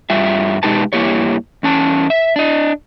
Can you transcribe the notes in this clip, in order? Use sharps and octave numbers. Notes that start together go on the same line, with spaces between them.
G2 G3 F4 E5
B2 G#3 D#4 G4 B4 A5
G2 A#3 E4 G4 C#5
E2 C#4 A5
E5
D4 D#5